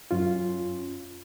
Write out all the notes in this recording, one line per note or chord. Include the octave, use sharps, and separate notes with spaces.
F#2 C#4 F4